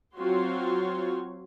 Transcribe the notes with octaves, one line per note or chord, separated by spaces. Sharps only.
F#3 C4 F4 F#4 C#5 C6